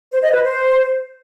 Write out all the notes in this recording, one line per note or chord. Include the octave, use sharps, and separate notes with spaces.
C5
D#5
B4
C5